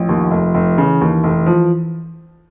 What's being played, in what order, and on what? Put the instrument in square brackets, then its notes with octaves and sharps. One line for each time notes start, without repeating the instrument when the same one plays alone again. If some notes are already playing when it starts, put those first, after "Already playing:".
Already playing: [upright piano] A1 [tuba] F3
[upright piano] D#2
F1
F1
[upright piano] C#3 [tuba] E3
[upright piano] D#2
F1
F3